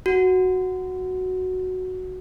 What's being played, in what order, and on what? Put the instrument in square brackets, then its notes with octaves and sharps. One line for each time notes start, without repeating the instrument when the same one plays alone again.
[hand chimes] F#4